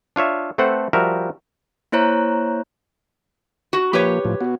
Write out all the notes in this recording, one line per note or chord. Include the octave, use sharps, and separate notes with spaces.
D4 F4 C#5 E5
A3 C4 A4 B4 C5 F#5
F3 G3 F#4 A#4 E5
A#3 E4 C5 C#5 A#5
F#4
F3 A#3 G4 B4 C#5
A2 F3
B3 F#4